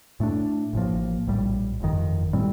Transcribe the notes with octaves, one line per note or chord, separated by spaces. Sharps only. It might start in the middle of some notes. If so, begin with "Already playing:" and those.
A2 A3 D4
A1 A2 F3 A#3
A#1 A2 G3
G1 F2 D#3
A2 G3 C4